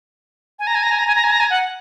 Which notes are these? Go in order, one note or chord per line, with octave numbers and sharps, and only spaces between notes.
G#5
A#5
G#5
A#5
G#5
A#5
G#5
A#5
G#5
A#5
G#5
F#5